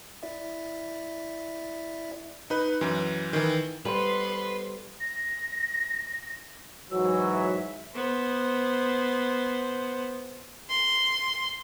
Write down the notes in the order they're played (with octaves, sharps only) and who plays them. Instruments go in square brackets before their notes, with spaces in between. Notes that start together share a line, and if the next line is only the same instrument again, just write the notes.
[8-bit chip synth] E4 D5 E5
[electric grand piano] D#4 B4
F#2 E3
D#3 E3
[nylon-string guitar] G3 [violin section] B3 C6 [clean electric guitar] A4 C5 [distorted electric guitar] B4
[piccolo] A#6
[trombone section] G#2 E3 F#3 [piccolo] E6
[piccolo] E5
[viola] B3 C5
[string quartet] C6